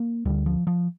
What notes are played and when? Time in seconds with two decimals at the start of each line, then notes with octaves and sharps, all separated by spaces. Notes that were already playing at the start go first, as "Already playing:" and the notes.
Already playing: A#3
0.25 D2 D3 G3
0.46 F3
0.67 F3